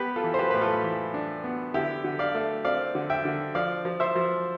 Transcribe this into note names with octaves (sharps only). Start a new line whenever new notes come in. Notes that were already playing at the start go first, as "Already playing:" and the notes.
Already playing: B3 G4 B4
F4 A4
E3
C5
G4 B4
A2 B4
F4 A4
E3
D4
B3
D3 E4 G4
D3
D5 F5
A3
C4 D5 F5
D3
E5 G5
D3
F3 D5 F5
F3
C5 E5
F3